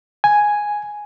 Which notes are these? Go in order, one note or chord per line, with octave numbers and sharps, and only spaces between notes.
G#5